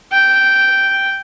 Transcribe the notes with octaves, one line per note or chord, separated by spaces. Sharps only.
G5